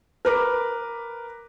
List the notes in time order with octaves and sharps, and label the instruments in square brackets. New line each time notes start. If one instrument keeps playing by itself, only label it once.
[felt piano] A#4 B4 D6